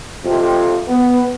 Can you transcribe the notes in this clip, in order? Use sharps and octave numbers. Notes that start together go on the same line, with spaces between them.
F2 C3
B3